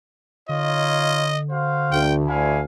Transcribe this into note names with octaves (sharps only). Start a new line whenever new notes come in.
D3 D#4 F4 C#5 D#5
F#4 C5 F5
D2 G5
E4 F5 G#5